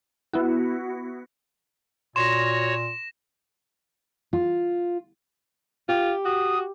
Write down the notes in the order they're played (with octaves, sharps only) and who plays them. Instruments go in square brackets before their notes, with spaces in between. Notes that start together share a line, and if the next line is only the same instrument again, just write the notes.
[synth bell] B3 E4 F#4
[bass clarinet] A#2 [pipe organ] F#4 C#5 [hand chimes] C6 [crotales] A#6 E7
[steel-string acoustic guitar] F4
[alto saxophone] F4 [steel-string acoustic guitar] G4
[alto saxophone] F#4 [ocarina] D#6